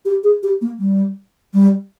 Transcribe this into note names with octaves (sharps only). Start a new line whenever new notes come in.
G4
G#4
G4
A#3
G3
G3